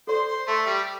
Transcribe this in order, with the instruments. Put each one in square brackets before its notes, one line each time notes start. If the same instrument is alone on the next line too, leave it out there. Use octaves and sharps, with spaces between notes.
[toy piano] A4 D5 C6 [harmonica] C5
[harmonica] C5
A3
G3